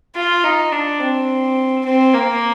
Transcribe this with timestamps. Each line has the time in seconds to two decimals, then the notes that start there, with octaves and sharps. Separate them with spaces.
0.16 F4
0.44 D#4
0.72 D4
1.00 C4
1.85 C4
2.13 A#3